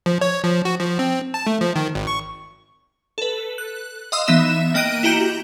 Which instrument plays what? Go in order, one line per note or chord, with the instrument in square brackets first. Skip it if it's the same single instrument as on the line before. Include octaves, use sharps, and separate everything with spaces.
[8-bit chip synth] F3
C#5
F3
F#4
F3
C4
A5
A3
F3
D#3
G#1
C#6
[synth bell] A4 B4
F#6
D#5 F5 C6 D#6 E6
E3 B3 D#4 E5 E7
A#3 D#5 G5 F#6 D7 D#7
E4 F#4 G4 A#5 G6